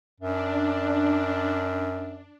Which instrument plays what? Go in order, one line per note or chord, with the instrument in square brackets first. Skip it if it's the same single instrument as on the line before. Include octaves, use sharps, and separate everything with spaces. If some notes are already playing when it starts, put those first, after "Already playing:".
[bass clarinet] F#2 [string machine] D4